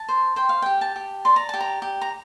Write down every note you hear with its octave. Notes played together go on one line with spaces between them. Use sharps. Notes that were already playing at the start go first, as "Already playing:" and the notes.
Already playing: A5
C5
C5 G5
F5
G4 G5
A5
G4
D5 C6
A#5
G4 A5
A#5
G4
A#5